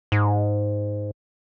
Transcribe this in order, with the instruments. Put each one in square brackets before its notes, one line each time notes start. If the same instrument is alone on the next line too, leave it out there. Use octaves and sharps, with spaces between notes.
[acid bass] G#2